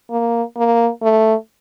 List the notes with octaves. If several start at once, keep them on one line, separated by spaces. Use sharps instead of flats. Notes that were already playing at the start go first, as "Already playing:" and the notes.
A#3
A#3
A3